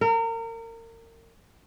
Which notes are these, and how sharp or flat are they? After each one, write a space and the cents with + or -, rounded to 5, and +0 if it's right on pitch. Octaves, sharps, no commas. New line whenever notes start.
A#4 -30